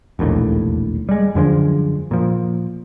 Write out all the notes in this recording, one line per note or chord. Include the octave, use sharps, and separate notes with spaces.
E1 A#1 D#2 A2
G3 G#3
F#2 D3 F3 G#3
A#2 F3